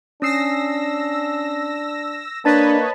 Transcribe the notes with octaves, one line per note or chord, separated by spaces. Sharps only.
C#4 D4 D#6 E6 A#6 C7
A#3 D4 B4 C#5 D#5 A5 A6 B6